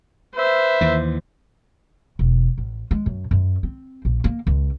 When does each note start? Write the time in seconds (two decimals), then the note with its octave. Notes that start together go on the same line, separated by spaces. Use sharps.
0.35 B4 C5 E5
0.81 D#2 E3
2.19 E1
2.58 A1
2.91 G#3
3.06 F#2
3.31 F#2
3.63 C4
4.05 A#1
4.24 A#3
4.47 C#2